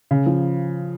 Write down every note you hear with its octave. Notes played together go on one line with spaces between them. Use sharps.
C#3
F3